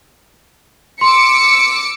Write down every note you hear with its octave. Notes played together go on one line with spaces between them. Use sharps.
C6 D6 E6 C#7